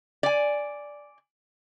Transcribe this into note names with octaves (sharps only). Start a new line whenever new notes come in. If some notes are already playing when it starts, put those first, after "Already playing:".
D5 G#5